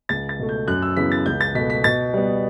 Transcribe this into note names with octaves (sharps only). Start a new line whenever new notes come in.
C#2 A6
A6
B2 A3
G6
F#2 F#6
E6
C#3 E3 B3 B6
A6
C#2 G6
A6
B2 A3 B6
B6
B2 A6
G3 B3